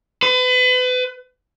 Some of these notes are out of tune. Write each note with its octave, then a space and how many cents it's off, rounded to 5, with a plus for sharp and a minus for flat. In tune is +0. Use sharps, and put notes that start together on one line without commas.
B4 +35